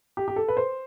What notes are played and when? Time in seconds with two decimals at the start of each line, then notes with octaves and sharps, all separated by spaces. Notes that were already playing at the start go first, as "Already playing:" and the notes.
0.17 G4
0.28 G4
0.36 A4
0.48 B4
0.57 C5